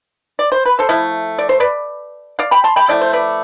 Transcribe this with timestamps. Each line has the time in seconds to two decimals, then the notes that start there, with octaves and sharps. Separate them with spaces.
0.39 D5
0.52 C5
0.65 B4
0.79 A4 C5
0.89 F3 A3 E4
1.39 D5
1.49 C5
1.60 B4 D5
2.39 D5 F5
2.51 G5 B5
2.64 A5 C6
2.76 G5 B5
2.88 F3 A3 E4 D5
3.01 C5
3.13 B4 D5